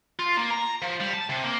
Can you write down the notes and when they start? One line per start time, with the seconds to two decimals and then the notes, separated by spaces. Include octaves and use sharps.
0.19 F4
0.37 A#3
0.50 A#5
0.82 F3
1.00 G3
1.13 A5
1.29 C3
1.44 A#3